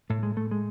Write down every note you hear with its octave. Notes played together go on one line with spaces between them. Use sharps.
A2 A3
G#3
A3
G#3